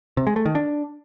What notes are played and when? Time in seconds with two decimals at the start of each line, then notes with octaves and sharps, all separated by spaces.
0.17 C3
0.27 G#3
0.36 A3
0.46 D#3
0.55 D4